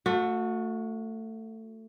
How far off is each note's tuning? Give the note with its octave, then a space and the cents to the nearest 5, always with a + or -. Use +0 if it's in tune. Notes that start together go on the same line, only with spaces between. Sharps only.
A3 +20 F#4 -30